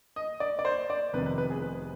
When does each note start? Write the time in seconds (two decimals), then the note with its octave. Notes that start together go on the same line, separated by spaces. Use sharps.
0.16 D#5
0.40 D5
0.59 D5
0.65 C5
0.90 D5
1.13 F1 F2 C3 D#3 B3 B4
1.26 B4
1.38 B4
1.50 G#4
1.62 B4